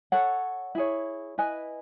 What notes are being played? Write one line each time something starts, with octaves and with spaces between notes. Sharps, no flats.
A4 C#5 F#5
E4 G#4 C#5
E4 B4 D#5 G#5